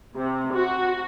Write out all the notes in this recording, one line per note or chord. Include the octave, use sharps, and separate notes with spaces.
C3
F#4